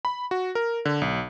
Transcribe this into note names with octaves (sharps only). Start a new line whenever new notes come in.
B5
F#4
A#4
D3
B1